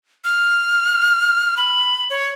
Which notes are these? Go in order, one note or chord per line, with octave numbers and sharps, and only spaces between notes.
F6
B5
C#5